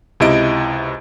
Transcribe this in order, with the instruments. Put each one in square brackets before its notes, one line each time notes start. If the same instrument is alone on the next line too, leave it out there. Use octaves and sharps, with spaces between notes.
[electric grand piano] C#2 C3 E4 D#5 D7